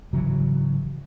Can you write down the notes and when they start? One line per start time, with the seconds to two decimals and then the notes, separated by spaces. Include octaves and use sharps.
0.13 G#1 C#3 E3 F#3